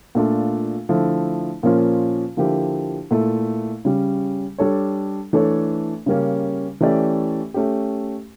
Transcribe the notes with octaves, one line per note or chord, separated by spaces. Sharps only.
A#2 A3 D4 F4
D3 F3 A3 E4
A#2 F3 A#3 C#4 F4
D3 F3 A#3 E4 G4
A#2 A3 E4
C#3 G3 C#4
G3 D4 A4 C#5
E3 A3 D4 A4 C#5
C#3 G3 A#3 C#4
E3 A3 C#4 G4 D5
A3 C#4 G4